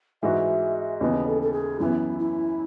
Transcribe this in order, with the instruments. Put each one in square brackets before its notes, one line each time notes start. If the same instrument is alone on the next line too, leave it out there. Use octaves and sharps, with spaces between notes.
[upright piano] G#2 E3 G#3 D#4 F#4 [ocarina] E5
[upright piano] D#2 C#3 E3 B3 [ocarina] D#5
[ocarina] A4
A4
G#4
[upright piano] F#2 E3 B3 [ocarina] E4
[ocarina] E4